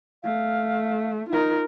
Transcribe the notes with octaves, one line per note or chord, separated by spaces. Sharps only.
A3 F5
D#4 F4 A#4